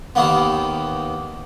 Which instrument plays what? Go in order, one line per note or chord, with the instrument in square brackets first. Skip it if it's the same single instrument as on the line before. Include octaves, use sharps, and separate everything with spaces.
[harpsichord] D#2 D#3 A#3 B3